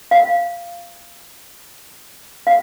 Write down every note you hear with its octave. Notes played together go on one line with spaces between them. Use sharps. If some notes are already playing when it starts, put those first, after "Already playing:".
F5
F5